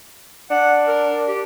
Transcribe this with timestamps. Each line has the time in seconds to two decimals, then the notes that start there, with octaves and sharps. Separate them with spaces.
0.51 D4 F#5
0.87 A#4
1.28 G4